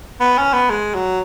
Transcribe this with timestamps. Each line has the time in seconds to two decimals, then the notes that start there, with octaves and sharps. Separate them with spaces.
0.20 B3
0.38 C#4
0.53 B3
0.70 G#3
0.94 F#3